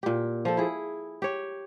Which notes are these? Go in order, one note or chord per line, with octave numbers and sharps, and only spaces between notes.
A#2 G4
F3 A4
E4 G#4
G4 C#5